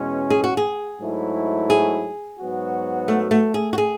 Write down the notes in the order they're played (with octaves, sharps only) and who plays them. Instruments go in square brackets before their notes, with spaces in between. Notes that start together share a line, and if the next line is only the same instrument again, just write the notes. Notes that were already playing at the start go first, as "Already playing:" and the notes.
Already playing: [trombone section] E2 B2 G#3 C#4
[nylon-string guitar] G#4
F#4
G#4
[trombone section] G#2 F#3 A3 E4
[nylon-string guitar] G#4
[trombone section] G#2 F#3 B3 F#4
[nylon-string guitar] A3
A3
G#4
F#4
G#4